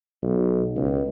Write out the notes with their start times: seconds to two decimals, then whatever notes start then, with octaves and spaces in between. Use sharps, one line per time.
0.23 B1
0.76 C#2